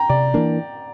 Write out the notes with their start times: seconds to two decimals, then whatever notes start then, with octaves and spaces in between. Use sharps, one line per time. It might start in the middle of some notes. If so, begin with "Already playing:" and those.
Already playing: G5 A#5
0.09 C3 D5
0.34 E3 A#3 D4